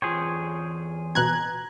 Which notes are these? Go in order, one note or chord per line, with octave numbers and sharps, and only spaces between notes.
E2 F4 G#4 C5 C#5 G5
B2 A#5 F#6 G#6